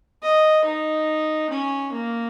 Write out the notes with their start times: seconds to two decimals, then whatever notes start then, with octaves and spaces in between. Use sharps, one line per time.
0.22 D#5
0.64 D#4
1.50 C#4
1.92 A#3